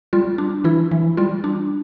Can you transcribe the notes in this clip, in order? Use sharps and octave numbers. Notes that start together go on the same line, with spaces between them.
G3 F4
D4
E3 E4
E3
G3 F4
D4